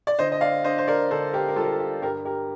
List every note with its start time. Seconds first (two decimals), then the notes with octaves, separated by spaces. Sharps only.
0.07 D5
0.19 D3 C5 D#5
0.32 D#5
0.41 D5 F5
0.64 D4 C5 D#5
0.78 C5
0.88 A#4 D5
1.11 D3 A4 C5
1.33 G4 A#4
1.48 A#4
1.56 G3 F4 A4
1.64 A#4
1.72 A4
1.80 G4
2.02 G2 G4 A#4
2.25 G4 A#4